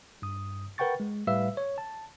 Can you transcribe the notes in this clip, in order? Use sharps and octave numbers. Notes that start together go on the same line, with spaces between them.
G2 D#6
A#4 B4 F#5 G5 C#6 A6
G#3
A2 G3 B4 E5 F5 E6
C#5
A5